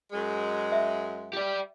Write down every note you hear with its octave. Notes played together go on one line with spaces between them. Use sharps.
F#2 G#3
E5
G4 D5